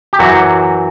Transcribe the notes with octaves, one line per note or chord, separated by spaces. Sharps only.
G4
F#2 E3 F#3 F#4